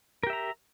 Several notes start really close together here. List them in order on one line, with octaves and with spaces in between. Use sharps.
A#4 G4 E5 A#5